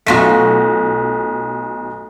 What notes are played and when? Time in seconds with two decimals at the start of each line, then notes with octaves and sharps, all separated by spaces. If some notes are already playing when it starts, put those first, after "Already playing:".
0.06 B1 A3 F4 F#4 A#6 B6